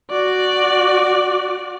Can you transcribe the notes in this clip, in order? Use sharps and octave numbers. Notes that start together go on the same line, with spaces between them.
F#4 D5